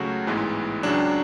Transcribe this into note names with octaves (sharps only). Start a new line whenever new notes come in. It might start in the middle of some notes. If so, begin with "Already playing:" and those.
Already playing: C#2 C#3 F#3 A3 F#4
A1 G#2 E3 G#3 B3
C#2 C#3 F#3 D4